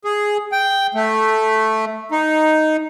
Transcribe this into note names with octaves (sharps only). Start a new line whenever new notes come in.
G#4
G5
A3
D#4